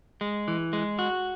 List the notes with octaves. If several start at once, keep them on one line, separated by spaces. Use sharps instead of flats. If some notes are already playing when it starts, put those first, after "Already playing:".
G#3
E3
G#3
F#4